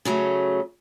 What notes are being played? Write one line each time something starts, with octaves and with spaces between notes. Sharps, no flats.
C#3 F#3 A3